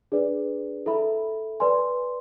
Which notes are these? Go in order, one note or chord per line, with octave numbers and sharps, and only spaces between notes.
D4 G#4 B4 D5
E4 A4 E5 B5
B4 D5 G#5 C6